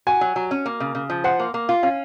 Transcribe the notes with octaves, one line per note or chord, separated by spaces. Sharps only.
F#4 G#5
F#3
F#3
C#4
A#3
C#3
C#3
F3
C5 F#5
A#3
A#3
F4
C#4 F5